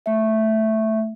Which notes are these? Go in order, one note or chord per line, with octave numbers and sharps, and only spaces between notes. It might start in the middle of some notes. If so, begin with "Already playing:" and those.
A3 E5